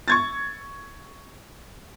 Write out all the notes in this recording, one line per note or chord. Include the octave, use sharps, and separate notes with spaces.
C#6 G#6 A6